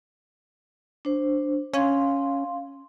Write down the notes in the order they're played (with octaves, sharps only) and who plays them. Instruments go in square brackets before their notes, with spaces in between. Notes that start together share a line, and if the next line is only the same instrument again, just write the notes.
[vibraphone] D4 C5
[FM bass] C#4 [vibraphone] F5 C6